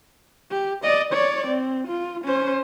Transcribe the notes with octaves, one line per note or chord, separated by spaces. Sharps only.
G4
D5 D#5
C#5 D5
C4
F4
C#4 C5